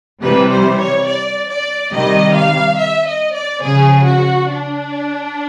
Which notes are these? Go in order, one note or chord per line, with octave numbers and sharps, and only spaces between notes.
C3 E3 G3 B4
C5
C#5
D5
D5
C3 D#3 G3 D#5
F5
E5
D#5
D5
C#3 F3 G#4
F#4
D4